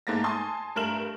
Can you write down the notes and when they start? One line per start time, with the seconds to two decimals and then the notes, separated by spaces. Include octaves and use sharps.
0.07 G#2 A3 A#3 A6 A#6
0.24 G#5 A5 C6 D#6
0.76 G2 A3 A#4 F6 E7 F#7